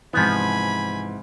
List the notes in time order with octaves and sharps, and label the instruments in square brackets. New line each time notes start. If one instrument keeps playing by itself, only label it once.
[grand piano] G#2 C3 E3 [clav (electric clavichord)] F3 B3 [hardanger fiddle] G#5 B5